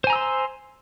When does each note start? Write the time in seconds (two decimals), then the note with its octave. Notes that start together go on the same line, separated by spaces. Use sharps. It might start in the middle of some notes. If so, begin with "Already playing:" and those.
0.04 C5
0.07 G#5
0.10 A#5
0.13 E6
0.16 C6